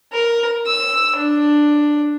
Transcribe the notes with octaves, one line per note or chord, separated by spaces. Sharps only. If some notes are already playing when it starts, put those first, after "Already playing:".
A#4
E6
D4